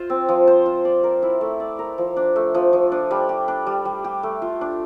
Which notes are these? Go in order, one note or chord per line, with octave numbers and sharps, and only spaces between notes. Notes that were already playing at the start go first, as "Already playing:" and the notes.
Already playing: F4 C5
C4
F3
C5
F4
D5
A#4
E4
A3
D5
A#4
F3
D4
A3
F3
F3
D4
G3
G4
D4
G3
G3
G4
A3
F4
D4